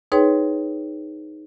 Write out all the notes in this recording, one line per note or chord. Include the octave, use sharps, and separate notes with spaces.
D#4 G#4 B4 C#5 G5 C6